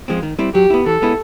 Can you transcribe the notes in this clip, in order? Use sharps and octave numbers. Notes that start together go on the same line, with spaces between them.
F3 G#3 C4
D#3
G3 C4 E4
F#3 G4
B3 E4
E3 A4
G#3 B3 E4